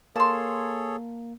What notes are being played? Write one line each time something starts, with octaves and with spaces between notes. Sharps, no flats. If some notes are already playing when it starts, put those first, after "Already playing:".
A#3 G#4 A4 C#5 A5 C6